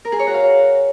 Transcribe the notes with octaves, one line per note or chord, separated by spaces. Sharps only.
A#4
G#4
C#5
F#4
F5